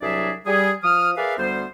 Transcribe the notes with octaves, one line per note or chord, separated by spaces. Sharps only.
C2 F#3 D4 G#4 D5 E5
G3 G#4
F3 D#6 F6
G#4 A#4 B4 D5 E5 F5
D2 G3 B3 C5